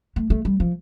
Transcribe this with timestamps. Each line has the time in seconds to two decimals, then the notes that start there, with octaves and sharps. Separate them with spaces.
0.16 A3
0.30 A3
0.45 G3
0.60 F3